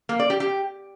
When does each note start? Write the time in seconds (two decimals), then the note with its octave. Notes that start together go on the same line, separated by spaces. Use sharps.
0.09 A#3
0.19 D5
0.30 G4
0.40 G4